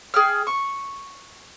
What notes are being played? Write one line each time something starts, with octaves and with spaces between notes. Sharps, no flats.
G#4 G5 F6
C#6